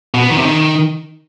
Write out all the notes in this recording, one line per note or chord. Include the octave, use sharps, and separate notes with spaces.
B2
B3
D#3
C3
D#3